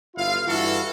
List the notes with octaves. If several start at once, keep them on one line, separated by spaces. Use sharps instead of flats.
G1 E4 F4 F5
G2 E3 E4 F#4 A4